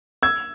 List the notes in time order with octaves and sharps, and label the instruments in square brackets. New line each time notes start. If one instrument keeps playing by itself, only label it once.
[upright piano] E6 G#6